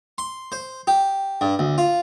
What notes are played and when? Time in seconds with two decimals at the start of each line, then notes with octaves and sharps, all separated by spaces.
0.18 C6
0.52 C5
0.87 G4
1.41 G2
1.59 D2
1.78 F4